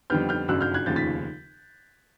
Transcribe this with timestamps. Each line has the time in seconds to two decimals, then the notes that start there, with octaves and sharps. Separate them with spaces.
0.10 F2 D3 G3 B3 F6 G6
0.29 F6 G6
0.48 G1 F#2 C#3 F#3 E6 F#6
0.61 F6 G6
0.74 F#6 G#6
0.86 F1 D#2 C#3 F3 G6 A6
0.96 A6 B6